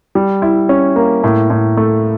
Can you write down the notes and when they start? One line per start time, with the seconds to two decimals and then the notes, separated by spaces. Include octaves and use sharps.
0.15 G3
0.42 E4
0.69 C#4
0.96 A#3
1.24 A2
1.50 A2
1.77 A3